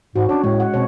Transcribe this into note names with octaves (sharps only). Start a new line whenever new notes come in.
G#2 F#4
C#4 D4 C#5
A2 G#3
F#5
B2 C4 C#5